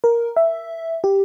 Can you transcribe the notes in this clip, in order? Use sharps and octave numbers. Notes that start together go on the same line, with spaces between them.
A#4
E5
G4